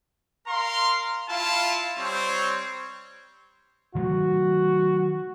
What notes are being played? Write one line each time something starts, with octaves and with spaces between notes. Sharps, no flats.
A#4 F5 A#5 C6
E4 F4 F5 A5
G3 C4 C5 C#5
D#3 F#3 A3 F#4